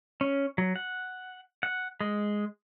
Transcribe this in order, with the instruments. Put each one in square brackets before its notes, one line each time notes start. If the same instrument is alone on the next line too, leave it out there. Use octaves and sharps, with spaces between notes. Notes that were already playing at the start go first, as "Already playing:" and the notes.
[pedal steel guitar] C#4
F#3
F#5
F#5
G#3